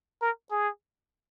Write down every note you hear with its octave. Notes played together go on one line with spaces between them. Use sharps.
A#4
G#4